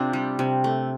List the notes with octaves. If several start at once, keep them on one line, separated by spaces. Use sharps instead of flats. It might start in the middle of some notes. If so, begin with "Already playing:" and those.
Already playing: C3 C4 D4 F4
G3
C3
A3